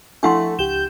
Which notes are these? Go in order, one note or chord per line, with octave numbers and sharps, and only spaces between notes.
F3 A3 D4 E4 F#5 C6 C#6
C#2 G4 G6 E7